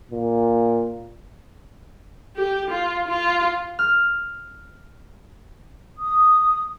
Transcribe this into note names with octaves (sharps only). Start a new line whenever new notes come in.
A#2
G4
F4
F4
F6
D#6